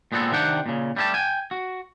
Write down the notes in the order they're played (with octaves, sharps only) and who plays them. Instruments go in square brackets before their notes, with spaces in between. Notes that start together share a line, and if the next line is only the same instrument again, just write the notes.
[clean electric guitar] A#2 G#3 B3 C4 A4
C3 D#3 D4 F#5 G5
A#2 C#3
G3 A3 G4 D5 A5
G5 G#5
F#4